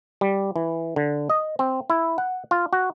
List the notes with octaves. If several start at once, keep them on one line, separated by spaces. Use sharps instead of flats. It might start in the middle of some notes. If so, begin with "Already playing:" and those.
G3
E3
D3
D#5
C4
E4
F#5
F4
F#4